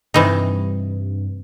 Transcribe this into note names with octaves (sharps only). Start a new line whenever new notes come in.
G2 C3 E3 D#4